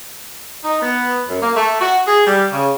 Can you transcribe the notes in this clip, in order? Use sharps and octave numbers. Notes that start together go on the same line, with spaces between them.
D#4
B3
F#2
A#3
A3
F#4
G#4
G3
C#3